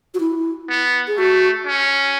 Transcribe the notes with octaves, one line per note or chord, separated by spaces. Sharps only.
F#4
E4
B3
G#4
A3 F#4
C#4